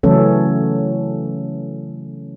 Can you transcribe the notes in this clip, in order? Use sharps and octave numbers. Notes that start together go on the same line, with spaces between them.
C#3 E3 F#3 A3 C#4 A4